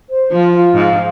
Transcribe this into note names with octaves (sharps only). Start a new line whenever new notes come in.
C5
F3 F4
F4
G#2 F5